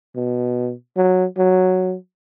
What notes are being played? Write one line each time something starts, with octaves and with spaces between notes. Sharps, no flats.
B2
F#3
F#3